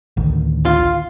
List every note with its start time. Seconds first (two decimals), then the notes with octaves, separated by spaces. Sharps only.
0.17 A1 D2 D#3
0.65 F4